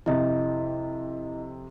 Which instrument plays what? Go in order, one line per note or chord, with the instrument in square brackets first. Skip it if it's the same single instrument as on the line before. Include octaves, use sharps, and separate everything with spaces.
[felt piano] F2 C3 [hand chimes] E4 D#5